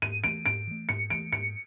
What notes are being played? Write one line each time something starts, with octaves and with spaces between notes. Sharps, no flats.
G#2 D#7
E3 A3 D7
G#2 D7
E3 A3
G#2 C#7
E3 A3 D7
G#2 C#7